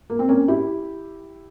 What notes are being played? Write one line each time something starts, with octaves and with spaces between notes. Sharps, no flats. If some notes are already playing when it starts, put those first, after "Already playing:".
A#3
C4
A#3 C#4
E4 G4